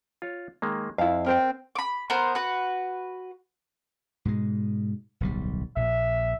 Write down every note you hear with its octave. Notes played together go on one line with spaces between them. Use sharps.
F4 C#5
D#3 G#3 A#3
F2 E4 F5
C4 A#4 C5 G5
B5 D6
B3 A#4 C5
F#4 B4
G#2 B2 G#3
D1 B1 G3
A#1 A#2 E5